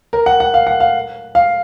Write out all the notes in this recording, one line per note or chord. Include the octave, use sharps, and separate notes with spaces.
A#4
F#5
F#5
F5
F#5
F5
F5